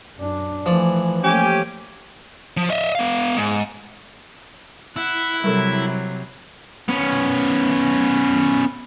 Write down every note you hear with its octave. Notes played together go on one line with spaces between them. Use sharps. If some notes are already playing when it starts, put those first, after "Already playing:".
F#2 D4
E3 F3 A3 D5
A3 A#3 C#4 G4 G#5
F3
D#5 E5
B3 F5
G#2
E4 F#5
C3 F#3 G3 A4 A#4
B3 C#4